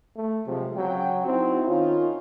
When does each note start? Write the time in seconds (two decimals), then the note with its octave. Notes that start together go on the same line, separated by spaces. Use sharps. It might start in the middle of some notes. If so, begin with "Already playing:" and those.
0.16 A3
0.47 C3 F3 F#3 G#3
0.76 C#3 F#3 C#4 G5
1.26 C4 D#4 E4 F#4
1.68 D#3 C#4 D#4 F4